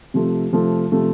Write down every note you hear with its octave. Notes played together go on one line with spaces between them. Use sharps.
C3 F3 A3
C3 F3 A3
C3 F3 A3